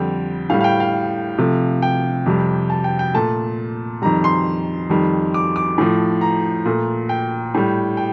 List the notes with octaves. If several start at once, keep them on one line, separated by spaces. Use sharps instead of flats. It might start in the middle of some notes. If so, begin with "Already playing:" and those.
Already playing: F2 D3 G3 G5
A2 G3 F5
F5
G5
F5
C3 F3 A3
G5
F2 C3 G3
A5
G5
G5
A#2 A3 A5
F2 D#3 G3 A#5
C6
F2 D#3 G3
D6
D6
A2 F3 A3
A#5
A#2 A3
G5
A2 G3
G5